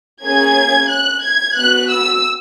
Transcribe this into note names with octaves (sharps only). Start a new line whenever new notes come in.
A#3 C#4 G#4 G#6
F#6
G#6
B3 F#4 F#6
E6